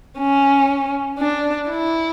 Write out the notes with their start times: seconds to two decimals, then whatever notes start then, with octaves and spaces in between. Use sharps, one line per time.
0.19 C#4
1.19 D4
1.69 E4